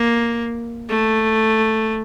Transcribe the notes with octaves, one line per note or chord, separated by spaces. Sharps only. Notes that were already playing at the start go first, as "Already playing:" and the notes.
Already playing: A#3
A3